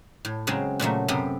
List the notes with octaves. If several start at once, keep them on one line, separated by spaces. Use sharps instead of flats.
A2
C#3 F#3 G#3 C4
A#2 C#3 F#3 A3
F#2 C3 B3 C4